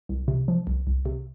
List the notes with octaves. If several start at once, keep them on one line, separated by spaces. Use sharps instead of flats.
C2
C3
F3
C2
C2
C3